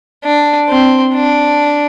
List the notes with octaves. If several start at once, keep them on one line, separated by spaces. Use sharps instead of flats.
D4
C4
D4